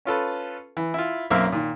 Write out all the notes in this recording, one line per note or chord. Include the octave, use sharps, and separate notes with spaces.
C#4 F4 A4 B4
E3
E4 F4
B1 F#2 A#3 C4 E5 F5
A#2 D#3